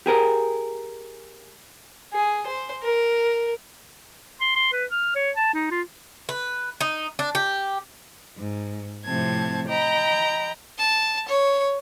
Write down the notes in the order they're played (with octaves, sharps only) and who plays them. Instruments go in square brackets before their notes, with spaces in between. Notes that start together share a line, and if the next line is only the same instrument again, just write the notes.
[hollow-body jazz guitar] G4 G#4 A#4
[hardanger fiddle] G#4
C5
A#4
[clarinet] C6
C6
B4
F6
C#5
A5
D#4
F4
[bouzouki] B4
D#4
D4
G4
[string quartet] G#2
A2 C3 F3 C4 A5 G#6
D#5 G5 A#5 B5
[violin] A5
C#5